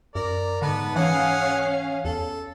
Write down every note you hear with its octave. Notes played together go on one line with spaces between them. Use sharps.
F#2 A#4 D5
G#2 D3 B3 B4 A5
E3 C#4 G#4 F5 F#5 G#5
E2 A4